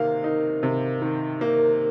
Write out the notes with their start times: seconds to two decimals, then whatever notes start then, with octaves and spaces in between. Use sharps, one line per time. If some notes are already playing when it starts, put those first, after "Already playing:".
Already playing: C3 D#3 A#3 F5
0.24 D#4
0.63 C3
1.02 D#3
1.41 A#3